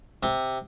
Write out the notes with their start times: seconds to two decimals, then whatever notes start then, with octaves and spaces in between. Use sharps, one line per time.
0.23 C3